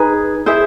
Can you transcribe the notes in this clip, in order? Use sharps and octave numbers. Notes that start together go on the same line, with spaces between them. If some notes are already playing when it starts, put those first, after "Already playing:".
Already playing: D#4 G#4 B4
E4 G#4 C5 E5